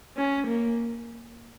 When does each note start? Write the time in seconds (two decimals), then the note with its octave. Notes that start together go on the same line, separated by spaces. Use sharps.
0.17 C#4
0.47 A#3